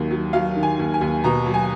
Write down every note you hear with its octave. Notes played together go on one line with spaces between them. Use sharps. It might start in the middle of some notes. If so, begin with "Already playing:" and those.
Already playing: D#2 D#3 F#3
F#3
F#3 F5
D#3
G#5
D#2
G#5
D#2
B2 A#5
F#3
G#5